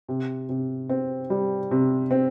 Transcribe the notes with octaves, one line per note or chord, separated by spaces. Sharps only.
C3
C3
C4
G3
C3
C4